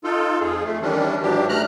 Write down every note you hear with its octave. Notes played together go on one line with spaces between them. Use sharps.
D#4 F4 A4
F2 G#4
A3
D#3 E3 G3 C#4 D4
G#2 E3 F#3 D4 G4
A3 A#5 F6 F#6